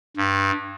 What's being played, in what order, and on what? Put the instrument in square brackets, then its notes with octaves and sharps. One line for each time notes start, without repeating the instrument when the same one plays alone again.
[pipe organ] G2